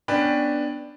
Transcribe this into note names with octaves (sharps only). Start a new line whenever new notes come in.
B3 C#4 D4 B4 G5 B5